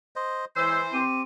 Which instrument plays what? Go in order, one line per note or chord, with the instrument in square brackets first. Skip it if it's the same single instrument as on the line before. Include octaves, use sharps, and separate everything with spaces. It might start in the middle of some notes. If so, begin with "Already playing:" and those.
[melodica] C5 D#5
[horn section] E3 C5 [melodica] G#3 C#5 [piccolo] E6
[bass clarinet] C4 [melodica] G4 [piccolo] D#7